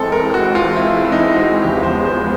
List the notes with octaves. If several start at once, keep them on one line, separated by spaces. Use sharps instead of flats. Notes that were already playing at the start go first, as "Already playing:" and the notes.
Already playing: E3 G#3 C4 A4
A#4
F#4
F4
E4
E4
D#4
E4
F#4
E2 C#3 F3 G#3 B3 G4
C5
C5